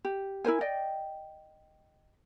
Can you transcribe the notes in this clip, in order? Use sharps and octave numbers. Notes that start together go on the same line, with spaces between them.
G4
E4 A#4 C5 G#5
D5 D#5 G5